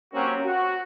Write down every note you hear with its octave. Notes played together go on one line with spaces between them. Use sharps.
F#3 A#3 C4 C#4 F#4 G4
F#4